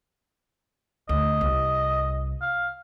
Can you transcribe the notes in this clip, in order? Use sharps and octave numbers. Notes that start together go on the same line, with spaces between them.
D2 D#5
C2
F5